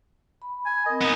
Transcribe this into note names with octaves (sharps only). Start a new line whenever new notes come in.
B5
G#5
C4 A#4 D#5
B3 D#4